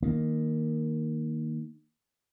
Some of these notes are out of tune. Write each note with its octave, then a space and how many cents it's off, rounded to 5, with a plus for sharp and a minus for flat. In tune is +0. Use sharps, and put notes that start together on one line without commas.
D#3 +0 A#3 +0